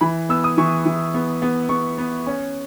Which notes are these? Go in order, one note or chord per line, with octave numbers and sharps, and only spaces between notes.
E3 B5
B3 E6
D#6
E3 C#6
E3
B3
B3
B3 C#6
B3
C#4